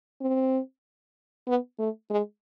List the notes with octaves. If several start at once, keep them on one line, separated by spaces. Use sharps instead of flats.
C4
B3
A3
G#3